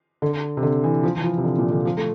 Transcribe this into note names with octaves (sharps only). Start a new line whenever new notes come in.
D3
C3
D3
E3
F3
E3
F3
C3
D3
A#2
D3
F3
A3